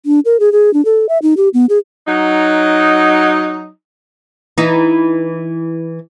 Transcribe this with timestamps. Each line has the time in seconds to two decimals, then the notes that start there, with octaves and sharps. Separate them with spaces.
0.06 D4
0.25 A#4
0.40 G#4
0.52 G#4
0.74 D4
0.85 A4
1.09 E5
1.22 D#4
1.37 G4
1.54 B3
1.69 G#4
2.07 F#3 D#4
4.58 E3 D#4